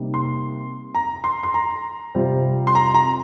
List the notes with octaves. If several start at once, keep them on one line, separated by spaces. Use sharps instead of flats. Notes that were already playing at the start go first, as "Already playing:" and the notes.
Already playing: C3 G3 A#3 D#4
C6
A#5
C6
C6
A#5
C3 G3 C4 F4
C6
A#5
A#5